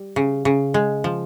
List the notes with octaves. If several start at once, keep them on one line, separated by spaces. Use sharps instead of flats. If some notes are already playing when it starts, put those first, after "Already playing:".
Already playing: G3
C#3
C#3
G#3
F3